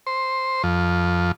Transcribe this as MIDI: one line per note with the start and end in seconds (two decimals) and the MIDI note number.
0.07 0.62 72
0.63 1.32 41